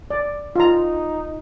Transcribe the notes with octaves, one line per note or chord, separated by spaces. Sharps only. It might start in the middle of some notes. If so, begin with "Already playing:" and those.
D5
D#4 F4 A#5